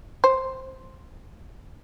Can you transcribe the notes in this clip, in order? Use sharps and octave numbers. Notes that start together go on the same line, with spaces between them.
C5